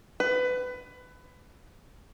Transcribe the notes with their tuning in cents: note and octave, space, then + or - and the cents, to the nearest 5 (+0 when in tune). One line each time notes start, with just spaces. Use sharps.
B4 +20